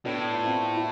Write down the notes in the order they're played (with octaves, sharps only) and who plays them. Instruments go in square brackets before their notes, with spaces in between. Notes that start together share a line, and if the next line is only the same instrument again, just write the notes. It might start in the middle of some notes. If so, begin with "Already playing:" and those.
[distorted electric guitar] A2 [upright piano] B3 D4
[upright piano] F4
C4 E4
E4